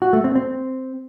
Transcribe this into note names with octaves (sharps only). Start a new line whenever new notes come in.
F#4
A3
C4
C4